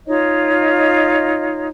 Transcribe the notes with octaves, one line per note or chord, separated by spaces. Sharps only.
D#4 F4 C#5 D#5